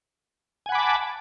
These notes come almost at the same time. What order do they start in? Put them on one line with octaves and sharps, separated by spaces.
G#5 F#5 B5 D6 A5